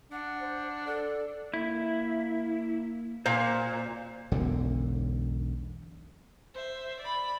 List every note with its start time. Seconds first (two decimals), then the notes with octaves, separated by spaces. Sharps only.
0.12 D4 F#5
0.40 C5
0.86 A4 D5
1.54 A#3 E4
3.26 A#2 C5 F5
4.32 E1 B1 F#2 D3
6.54 C5 E5
7.00 D5 B5